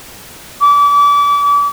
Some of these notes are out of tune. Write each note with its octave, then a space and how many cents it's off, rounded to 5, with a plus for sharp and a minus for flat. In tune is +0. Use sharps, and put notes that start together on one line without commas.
D6 -35